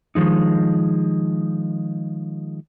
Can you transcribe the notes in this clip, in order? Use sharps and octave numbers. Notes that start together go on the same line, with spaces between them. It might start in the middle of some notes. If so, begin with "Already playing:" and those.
D#3 F3 G#3 D#4